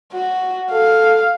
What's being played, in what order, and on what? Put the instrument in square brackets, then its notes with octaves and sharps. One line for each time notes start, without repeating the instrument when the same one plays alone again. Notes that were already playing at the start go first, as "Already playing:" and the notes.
[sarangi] F#4
[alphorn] A4 [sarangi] F5